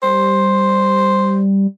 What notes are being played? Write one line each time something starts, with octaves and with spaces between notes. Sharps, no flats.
G3 C5